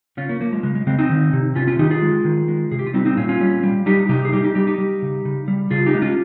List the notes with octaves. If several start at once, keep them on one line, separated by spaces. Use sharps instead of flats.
C#3 C#4 F4
A#3 C#4
F3 A#3
G#3
C#3 G#3
G#3
C#3 G#3 C4
C4 D#4
D#3
C3
C3 C#4 F4
C#4 F4
D#3 D#4 G4
F4 G#4
G#3
D#3
G#3
C3 G#4
G4
F4
G3 C4 D#4
C4 D#4
A#2 C#4 F4
C#4 F4
G3
G3
G3 D#4 G4
C3 D#4 G4
G#4
G3 D#4 G4
D#4 G4
G3 D#4 G4
D#4 G4
G3
C#3
C#3
G3
C#3 F4 G#4
D#4 G4
G#3
C#4 F4